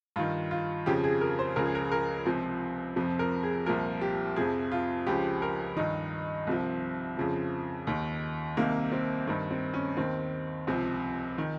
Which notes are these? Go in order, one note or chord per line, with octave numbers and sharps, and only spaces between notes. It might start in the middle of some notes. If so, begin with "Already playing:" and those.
G2 D#3 F4
F4
F2 C#3 F3 G4
G#4
A#4
C5
C#2 C#3 F3 A#4
G#4
A#4
A#4
C#2 C3 F3
F2 C3 F3
A#4
G#4
C2 A#2 F3 A#4
G4
F2 C3 F3 G#4
F4
C#2 C#3 F3 G4
A#4
G2 D#3 D#4
C2 C3 F3
F2 C#3 F3
D#2 D#3
C2 C3 D#3 A#3
C4
G2 D#3 C4
C4
C#4
D#2 D#3 C4
C#2 C3 F3
D#3